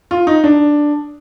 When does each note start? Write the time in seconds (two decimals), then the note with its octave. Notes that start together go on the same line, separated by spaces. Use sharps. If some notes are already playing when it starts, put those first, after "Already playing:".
0.11 F4
0.27 D#4
0.44 D4